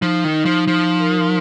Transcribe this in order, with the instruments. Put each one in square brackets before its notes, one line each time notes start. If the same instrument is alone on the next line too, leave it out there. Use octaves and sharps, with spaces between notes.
[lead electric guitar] F3 [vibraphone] D#4
[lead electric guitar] D#3
[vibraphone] D#4
[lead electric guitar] F3
[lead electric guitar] F3 [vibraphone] D#4
[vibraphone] A#4